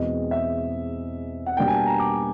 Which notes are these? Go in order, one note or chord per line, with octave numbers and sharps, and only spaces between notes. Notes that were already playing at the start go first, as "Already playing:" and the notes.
Already playing: E2 B2 G#3 C4 D#5
E5
F#5
B2 G3 A#3 D4 G5
G#5
A5
A#5
D6